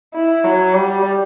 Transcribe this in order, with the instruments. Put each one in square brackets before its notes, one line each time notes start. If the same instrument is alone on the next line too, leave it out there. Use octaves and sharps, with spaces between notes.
[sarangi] E4
F#3
G3